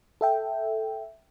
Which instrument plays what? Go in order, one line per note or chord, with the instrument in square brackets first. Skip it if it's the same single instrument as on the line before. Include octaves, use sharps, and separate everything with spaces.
[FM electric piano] A4 E5 G5